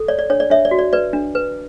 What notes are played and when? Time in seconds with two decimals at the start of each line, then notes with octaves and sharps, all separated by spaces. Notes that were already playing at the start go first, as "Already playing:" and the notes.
Already playing: A4
0.08 C#5 D5
0.19 D5
0.30 D4 C#5
0.40 D5
0.50 D4 C#5 E5
0.65 D5
0.71 F#4
0.79 D5
0.93 B4 D5
1.13 D4
1.35 B4